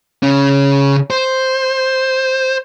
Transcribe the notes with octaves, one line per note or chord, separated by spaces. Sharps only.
C#3 C#4
C5